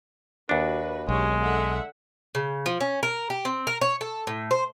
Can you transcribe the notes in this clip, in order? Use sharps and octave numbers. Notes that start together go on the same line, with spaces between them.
D#2 D4 F#4 B4
B1 G#3 C#4 G4 C#5
D3 E5 F#5
C#3
F3
C#4
A#4
G4
C4
A#4
C#5
A4
A2
C5